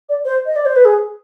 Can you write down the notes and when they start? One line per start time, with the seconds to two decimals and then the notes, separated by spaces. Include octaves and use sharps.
0.09 D5
0.25 C5
0.46 D#5
0.56 D5
0.65 C5
0.76 B4
0.85 G#4